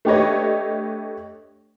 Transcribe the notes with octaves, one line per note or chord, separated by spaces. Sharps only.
A3 D4 G4 B4 C#5 D#5